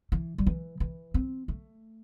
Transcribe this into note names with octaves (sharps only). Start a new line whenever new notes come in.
E3
G3
E3
E3
C4
A3